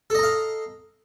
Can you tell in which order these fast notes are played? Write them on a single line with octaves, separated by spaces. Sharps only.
A4 D#5 A#5 F5